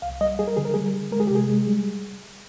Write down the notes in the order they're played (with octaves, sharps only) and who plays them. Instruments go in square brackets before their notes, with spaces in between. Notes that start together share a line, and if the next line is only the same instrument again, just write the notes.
[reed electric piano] C2 F5
G3 D#5
G3 G#4
A#4
D3 G#4
A#4
G3 G#4
D3
G#3 A#4
G#4
G4
C3
G#4
G#3
G3